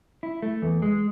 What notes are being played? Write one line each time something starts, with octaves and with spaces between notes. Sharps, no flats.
E4
A3
E2
G#3